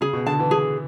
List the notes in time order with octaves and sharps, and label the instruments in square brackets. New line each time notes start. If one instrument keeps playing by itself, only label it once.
[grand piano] C#3 [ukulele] G#4
[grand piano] B2
[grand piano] D3 [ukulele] A5
[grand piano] E3
[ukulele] G#4